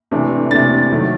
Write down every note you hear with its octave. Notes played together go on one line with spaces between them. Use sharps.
C3 E3 A3 D4
C3 E3 A3 D4 A6
C3 D#3 F#3 A3